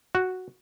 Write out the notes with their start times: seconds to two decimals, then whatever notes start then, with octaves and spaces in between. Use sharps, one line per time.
0.15 F#4